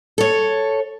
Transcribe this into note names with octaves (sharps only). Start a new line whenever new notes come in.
A4 C#5